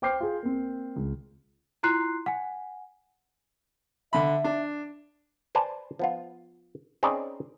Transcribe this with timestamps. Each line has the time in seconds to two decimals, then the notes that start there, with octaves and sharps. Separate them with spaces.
0.02 C5 G5 D6 F6 G6 C7
0.20 F4 G#4
0.43 A#3 C4
0.96 C#2
1.83 E4 F4 A#5 C6 F#6 C7
2.26 F#5 G#5
4.13 D3 E5 B5
4.44 D4
5.55 B4 C5 D5 G#5 A5
5.99 F3 B3 F4
7.03 C4 C#4 D#4 G#4 B4 D5